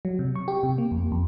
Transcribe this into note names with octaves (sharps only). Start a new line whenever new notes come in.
F#3
C3
C#6
G4
C3
A#3
F2
F2